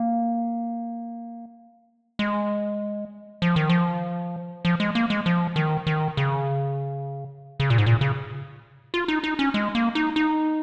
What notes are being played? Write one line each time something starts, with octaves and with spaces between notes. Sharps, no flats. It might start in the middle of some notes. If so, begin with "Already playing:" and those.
Already playing: A#3
G#3
F3
D#3
F3
F3
G#3
A#3
G#3
F3
D#3
D#3
C#3
C#3
A#2
G#2
A#2
C#3
F4
D#4
D#4
C#4
G#3
A#3
D#4
D#4